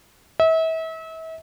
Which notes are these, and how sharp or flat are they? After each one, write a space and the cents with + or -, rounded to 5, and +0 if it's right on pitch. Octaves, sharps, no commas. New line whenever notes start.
E5 -35